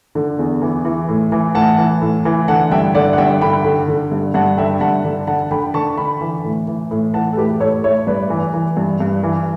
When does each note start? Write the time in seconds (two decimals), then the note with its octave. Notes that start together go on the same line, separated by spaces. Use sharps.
0.15 D3
0.39 E2
0.62 E3
0.85 E3
1.09 A2
1.32 E3
1.55 A2 F#5 A5
1.78 E3
2.02 A2
2.25 E3
2.48 D3 F#5 A5
2.71 G2 E5 G5
2.95 D3 D5 F#5
3.13 F#5
3.18 G2 E5 G5
3.41 D3 G5 B5
3.64 D3
3.88 D3
4.12 G2
4.34 G2 F#5 A5
4.58 D3 E5 G5
4.81 G2 F#5 A5
5.05 D3
5.27 D3 F#5 A5
5.51 D3 G5 B5
5.74 D3 A5 C#6
5.97 D3 G5 B5
6.21 E3
6.44 A2
6.68 E3
6.91 A2
7.14 E3 F#5 A5
7.33 A4
7.37 A2 G4 B4
7.60 A2 A4 C#5
7.84 A2 C#5 E5
8.07 G2 B4 D5
8.30 E3
8.54 E3
8.77 G2
9.00 G2
9.24 E3